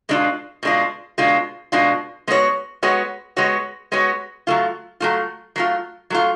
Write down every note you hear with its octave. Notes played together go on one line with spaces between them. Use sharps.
B2 G#3 D4 F4
B2 G#3 D4 F4
B2 G#3 D4 F4
B2 G#3 D4 F4
G#3 B3 F#4 C#5
G#3 B3 F#4 C#5
G#3 B3 F#4 C#5
G#3 B3 F#4 C#5
F#3 A3 F4
F#3 A3 F4
F#3 A3 F4
F#3 A3 F4